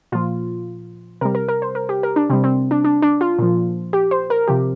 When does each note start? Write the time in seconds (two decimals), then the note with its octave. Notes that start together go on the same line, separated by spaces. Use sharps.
0.12 A#2 F3 F4
1.21 C3 G3 A#4
1.35 A#4
1.48 A#4
1.62 C5
1.75 A#4
1.89 G4
2.03 A#4
2.16 D4
2.30 C3 G3 C4
2.44 C4
2.71 D4
2.84 D4
3.02 D4
3.21 F4
3.39 A#2 F3
3.93 G4
4.11 C5
4.30 A#4
4.48 C3 F3 G4